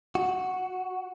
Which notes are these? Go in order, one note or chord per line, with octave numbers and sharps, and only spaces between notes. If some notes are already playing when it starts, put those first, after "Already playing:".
F#4